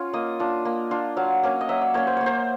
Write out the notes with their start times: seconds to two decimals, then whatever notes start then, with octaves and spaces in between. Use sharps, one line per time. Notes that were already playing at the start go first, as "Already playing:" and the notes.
Already playing: C#4 F4
0.13 A#3 D#5
0.39 D4 F4
0.65 A#3
0.91 D4 F4
1.17 F#3 F5
1.43 A#3 C#4
1.61 D#5
1.69 F#3 E5
1.81 D5
1.94 A#3 C#4 C#5
2.07 C5
2.17 A#3 C#5
2.26 C5